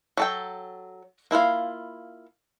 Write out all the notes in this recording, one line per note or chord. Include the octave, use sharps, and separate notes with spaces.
F#3 A4 G5
A#3 E4 F4 F5